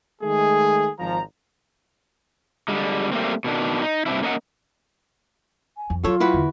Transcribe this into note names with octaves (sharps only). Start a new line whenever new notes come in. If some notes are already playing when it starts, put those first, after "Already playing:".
D#3 G#3 A3 G#4
G#1 F3 A#5
D3 G3 G#3
G3 A3 A#3 C4
B2 D#3 D4
D#4
G2 C3 C4 D4 E4
A#3 C#4 A#4 D#5 E5 F#5
G#5
F2
F#3 F4 A4 C#5
E4 F#4 B4
E2 D3